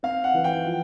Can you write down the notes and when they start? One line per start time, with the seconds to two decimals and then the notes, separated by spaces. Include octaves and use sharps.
0.03 C4 F5
0.24 F#5
0.34 E3
0.44 G5
0.65 F3